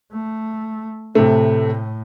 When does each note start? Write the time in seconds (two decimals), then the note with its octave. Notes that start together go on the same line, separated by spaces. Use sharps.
0.12 A3
1.15 A2 C3 A3